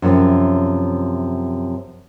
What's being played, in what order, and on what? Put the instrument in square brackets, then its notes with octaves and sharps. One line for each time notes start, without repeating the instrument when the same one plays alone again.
[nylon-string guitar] F#2 C3 F3